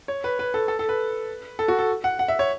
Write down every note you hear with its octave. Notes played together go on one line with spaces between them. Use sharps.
C#5
B4
B4
A4
A4
A4
B4
A4
F#4
A4
F#5
F#5
E5
C#5